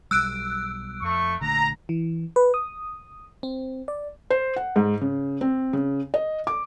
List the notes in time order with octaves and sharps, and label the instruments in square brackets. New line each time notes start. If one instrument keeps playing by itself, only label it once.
[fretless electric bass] B1 G3 [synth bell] E6 F#6 D7
[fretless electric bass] F2 [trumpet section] A3 C#6
[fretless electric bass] A#1 D3 A3 [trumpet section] A#5
[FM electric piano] E3
B4
D#6
C4
D5
[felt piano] C5
F#5
G#2
C#3
C4
C#3
D#5
D6